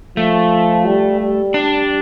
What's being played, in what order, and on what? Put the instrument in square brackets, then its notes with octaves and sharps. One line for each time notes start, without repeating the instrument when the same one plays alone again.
[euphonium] F3 [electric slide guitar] A3
[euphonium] G3
G3
[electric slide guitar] D4